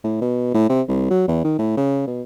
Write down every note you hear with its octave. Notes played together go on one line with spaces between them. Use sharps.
A2
B2
A2
C3
C2
F#3
E2
D#3
A2
C#3
B2